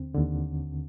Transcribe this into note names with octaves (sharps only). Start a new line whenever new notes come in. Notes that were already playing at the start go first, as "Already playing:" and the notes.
Already playing: D#2 D3 C4
D#2 D3